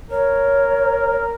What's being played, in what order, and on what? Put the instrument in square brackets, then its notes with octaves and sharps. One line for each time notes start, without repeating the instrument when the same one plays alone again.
[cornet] A#4 [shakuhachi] C#5